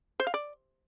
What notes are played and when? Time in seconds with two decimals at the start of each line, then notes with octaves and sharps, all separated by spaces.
0.20 C5
0.27 F5
0.34 D5